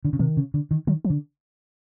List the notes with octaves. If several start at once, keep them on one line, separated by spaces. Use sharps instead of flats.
D3
C#3
C3 D#3
C#3
D3
D#3
D#3 F#3
F3
D3